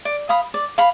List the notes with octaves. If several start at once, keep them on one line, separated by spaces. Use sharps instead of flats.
D5
F5 B5 D#6
D5
F5 B5